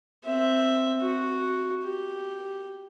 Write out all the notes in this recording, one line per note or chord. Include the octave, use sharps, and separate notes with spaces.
C4 E5
F#4
G4